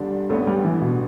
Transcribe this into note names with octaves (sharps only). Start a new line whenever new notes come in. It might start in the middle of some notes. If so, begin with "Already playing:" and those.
Already playing: G1 G2 D3 G3 D4
A1 G2 D3 A3 B3
G3
E3
B2